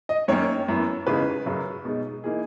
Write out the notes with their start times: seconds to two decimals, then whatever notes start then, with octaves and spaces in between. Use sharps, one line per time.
0.09 D#5
0.28 F#2 D#3 A#3 C#4 C#5
0.68 F#2 E3 B3
1.07 E2 C#3 G#3 D#4 B4
1.46 F#2 C#3 F#3
1.85 B2 G#3 D#4
2.24 E3 A#3 D#4 G#4